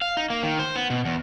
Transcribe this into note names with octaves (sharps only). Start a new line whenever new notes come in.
F5
D#4
A#3
D#3
C5
B3
B2
E2